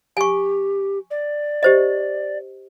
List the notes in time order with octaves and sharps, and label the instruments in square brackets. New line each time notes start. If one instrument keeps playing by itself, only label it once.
[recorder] G4 [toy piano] G#5 C#6
[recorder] D5
[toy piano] G4 C5 D#5